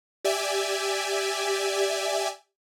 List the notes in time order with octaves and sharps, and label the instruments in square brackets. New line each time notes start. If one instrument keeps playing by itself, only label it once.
[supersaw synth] G4 D5 E5 G#5